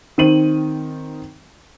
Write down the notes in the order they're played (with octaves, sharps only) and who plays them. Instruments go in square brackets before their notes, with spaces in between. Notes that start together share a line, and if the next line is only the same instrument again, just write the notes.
[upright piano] D#3 C4 D#7 F#7